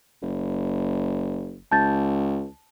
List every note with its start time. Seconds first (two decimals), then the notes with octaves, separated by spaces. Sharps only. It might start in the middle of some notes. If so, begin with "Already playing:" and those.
0.22 F#1
1.71 C#2 A5 G6 A6